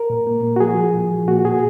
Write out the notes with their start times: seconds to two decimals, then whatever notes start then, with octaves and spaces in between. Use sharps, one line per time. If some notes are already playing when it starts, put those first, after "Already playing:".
Already playing: A#4
0.10 A#2
0.27 A#3
0.43 A#3
0.56 F#4
0.60 F3 G#4
0.78 F3
0.94 A#2
1.11 F3
1.28 A#3 F#4
1.45 A#2 G#4